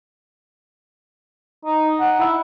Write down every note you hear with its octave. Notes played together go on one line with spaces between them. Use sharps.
D#4
F#5
E4